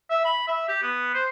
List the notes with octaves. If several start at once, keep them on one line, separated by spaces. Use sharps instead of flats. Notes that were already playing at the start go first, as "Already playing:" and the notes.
E5
B5
E5
G4
B3
C5